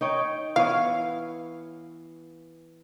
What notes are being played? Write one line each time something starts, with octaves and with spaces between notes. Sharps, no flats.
D#4 C#5 G5
E3 B3 C#5 F5